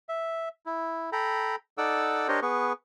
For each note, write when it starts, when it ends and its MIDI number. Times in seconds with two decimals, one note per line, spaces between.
0.09 0.49 76
0.66 1.10 64
1.12 1.56 69
1.12 1.56 79
1.12 1.56 82
1.12 1.56 83
1.78 2.28 63
1.78 2.28 69
1.78 2.28 74
1.78 2.28 78
1.78 2.28 86
1.78 2.28 88
2.28 2.40 62
2.28 2.40 67
2.28 2.40 70
2.28 2.40 72
2.28 2.40 73
2.28 2.40 75
2.42 2.73 59
2.42 2.73 68
2.42 2.73 71
2.42 2.73 85